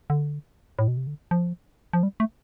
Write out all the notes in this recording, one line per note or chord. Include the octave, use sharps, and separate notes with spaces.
D3
A2
B2
C3
D3
F3
F3
G3
A3